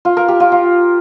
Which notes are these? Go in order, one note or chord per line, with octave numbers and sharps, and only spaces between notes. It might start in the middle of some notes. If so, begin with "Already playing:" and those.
F4
A#4
G4
F4
F4